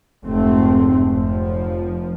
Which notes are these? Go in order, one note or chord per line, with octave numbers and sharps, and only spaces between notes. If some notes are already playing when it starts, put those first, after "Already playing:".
F1 G#2 C3 A3 C4
F1 F3